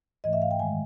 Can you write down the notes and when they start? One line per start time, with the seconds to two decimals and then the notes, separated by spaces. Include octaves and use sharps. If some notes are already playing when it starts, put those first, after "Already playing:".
0.24 G#2 E3 A3 D#5
0.33 E5
0.42 F5
0.51 G5
0.59 F#2 D#3 G#3 G#5